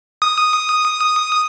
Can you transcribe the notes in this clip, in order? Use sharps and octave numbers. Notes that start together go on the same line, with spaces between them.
D#6